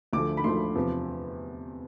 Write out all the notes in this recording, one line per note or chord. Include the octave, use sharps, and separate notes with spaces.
D2 D3 F3 A3 D6
B5
D2 D3 F3 A3 C6
E2 C3 F3